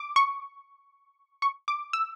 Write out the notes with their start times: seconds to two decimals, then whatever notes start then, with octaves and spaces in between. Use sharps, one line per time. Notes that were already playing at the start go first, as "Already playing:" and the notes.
Already playing: D6
0.16 C#6
1.42 C#6
1.68 D6
1.93 E6